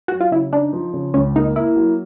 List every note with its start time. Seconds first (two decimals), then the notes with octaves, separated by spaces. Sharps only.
0.08 F#3 F#4
0.21 F4
0.31 C#3 E4
0.53 D4 D#4
0.73 F3
0.93 C#3
1.14 C#2 C#4
1.35 A#3 D#4
1.56 A#3 E4
1.76 F#3